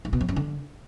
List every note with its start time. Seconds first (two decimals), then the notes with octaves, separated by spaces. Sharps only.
0.05 G#2
0.13 B2
0.21 F2
0.29 F#2
0.36 D3